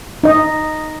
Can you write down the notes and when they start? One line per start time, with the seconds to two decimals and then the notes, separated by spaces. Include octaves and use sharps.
0.24 D#4 D#5